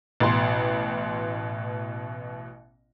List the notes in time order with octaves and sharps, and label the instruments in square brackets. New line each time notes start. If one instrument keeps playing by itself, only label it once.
[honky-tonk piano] A1 B2 C6